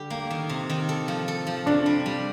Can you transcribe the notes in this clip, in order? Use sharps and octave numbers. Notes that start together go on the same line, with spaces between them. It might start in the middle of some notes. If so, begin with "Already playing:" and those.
Already playing: D3 G3 G4
A#3
D#3
C3
D#3
A4
F3
A4
F3
C3 D4
G3
G3